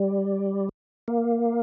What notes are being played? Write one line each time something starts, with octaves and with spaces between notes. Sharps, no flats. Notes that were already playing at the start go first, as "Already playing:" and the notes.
Already playing: G3
A#3